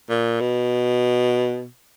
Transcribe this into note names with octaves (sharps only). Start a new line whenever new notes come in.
A#2
B2